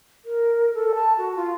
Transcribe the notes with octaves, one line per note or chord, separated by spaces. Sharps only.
A#4
A4
A5
F#4
F4